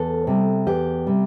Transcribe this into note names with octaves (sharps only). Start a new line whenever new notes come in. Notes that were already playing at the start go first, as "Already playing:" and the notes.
Already playing: E2 A4
C3 G3
E2 G4
C3 G3